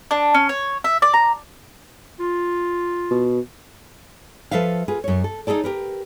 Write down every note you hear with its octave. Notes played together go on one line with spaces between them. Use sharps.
D4
C#4
C#5
E5
D5
A#5
F4
B2
F3 A4 B4 E5 F5
F4 G#4 B4
F#2 C#5
A4
D#4 E4 G#4 A4 D5
G4 A#4 B4